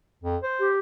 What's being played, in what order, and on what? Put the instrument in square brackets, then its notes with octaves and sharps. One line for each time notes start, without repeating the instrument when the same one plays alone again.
[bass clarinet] F2
C5
[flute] G4